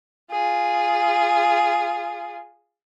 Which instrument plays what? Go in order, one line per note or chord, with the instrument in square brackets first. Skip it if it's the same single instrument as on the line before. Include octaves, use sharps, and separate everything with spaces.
[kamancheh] F4 G#4